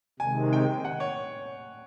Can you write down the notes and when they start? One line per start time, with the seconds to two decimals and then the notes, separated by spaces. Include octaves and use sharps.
0.20 C3 D#3 G#3 G#5
0.53 G5
0.85 F#5
1.00 C#5